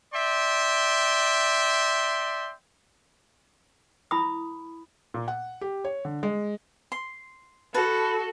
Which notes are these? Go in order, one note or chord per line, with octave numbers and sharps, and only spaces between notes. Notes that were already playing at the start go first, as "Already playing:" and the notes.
D5 E5 G5 C6
E4 B5 D#6
A#2
F#5
G4
C#5
D3
G#3
C6
F#4 A4 B4 A5